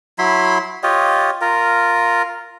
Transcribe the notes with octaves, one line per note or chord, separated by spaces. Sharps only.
F#3 E4 B5 C6
F4 G4 C#5 D#5
F4 A#4